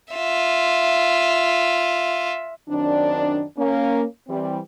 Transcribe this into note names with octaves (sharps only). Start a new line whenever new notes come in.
F4 E5
F#2 D#3 C4 D4
A#3 C#4
E3 G3 C4